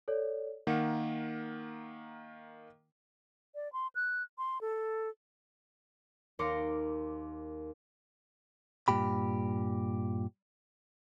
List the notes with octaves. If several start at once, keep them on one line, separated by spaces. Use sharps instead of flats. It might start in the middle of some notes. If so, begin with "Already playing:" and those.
A4 C#5 D5
D#3 A#3 F#5 C#7
D5
C6
F#6
C6
A4
D#2 A#4 C6 D6 A#6 C#7
G2 A#2 G4 B5